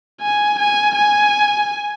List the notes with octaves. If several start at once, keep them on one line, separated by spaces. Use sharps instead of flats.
G#5
G#5
G#5